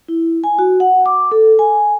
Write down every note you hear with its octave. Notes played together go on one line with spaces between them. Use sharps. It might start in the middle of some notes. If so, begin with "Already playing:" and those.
E4
G#5
F#4
F#5
D6
A4
G#5